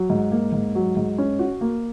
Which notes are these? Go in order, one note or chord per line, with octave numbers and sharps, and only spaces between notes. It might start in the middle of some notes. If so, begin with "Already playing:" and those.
Already playing: F#3
G#2
A#3
G#2
F#3
G#2
C#4
F#4
A#3